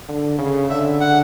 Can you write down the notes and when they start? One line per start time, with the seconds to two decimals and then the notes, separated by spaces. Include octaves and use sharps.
0.08 D3
0.38 C#3
0.70 D3 E5
1.00 F#5